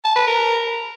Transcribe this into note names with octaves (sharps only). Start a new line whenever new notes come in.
A5
B4
A#4